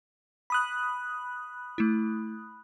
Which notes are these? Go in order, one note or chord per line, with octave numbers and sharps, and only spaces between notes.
B5 D#6 F#6
A3 E4